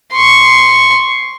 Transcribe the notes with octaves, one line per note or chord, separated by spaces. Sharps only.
C6 C#6